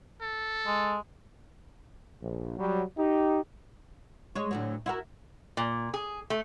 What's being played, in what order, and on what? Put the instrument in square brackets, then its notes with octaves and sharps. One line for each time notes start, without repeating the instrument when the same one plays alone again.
[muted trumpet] A4
[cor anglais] G#3
[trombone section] A#1
F#3 G3
D#4 G4
[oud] G#3 C#5
D2 A2 F#3
E4 F#4 A#4
[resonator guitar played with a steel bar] A#2
G#4
A3